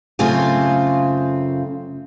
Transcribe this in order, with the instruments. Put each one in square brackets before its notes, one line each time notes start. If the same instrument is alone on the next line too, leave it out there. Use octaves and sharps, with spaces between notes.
[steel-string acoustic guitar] F#2 C#3 A3 C4 F4 G#5